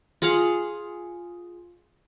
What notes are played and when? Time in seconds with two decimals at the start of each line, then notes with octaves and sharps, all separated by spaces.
0.22 F4 G#4 F5 F#5